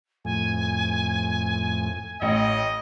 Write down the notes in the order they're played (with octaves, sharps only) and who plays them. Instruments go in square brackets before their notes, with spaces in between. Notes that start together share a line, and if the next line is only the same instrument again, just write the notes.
[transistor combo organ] F2 A2 [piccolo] G#5
[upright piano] A1 [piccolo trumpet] D#5